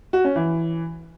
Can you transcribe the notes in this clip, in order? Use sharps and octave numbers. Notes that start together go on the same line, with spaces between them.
F#4
C#4
E3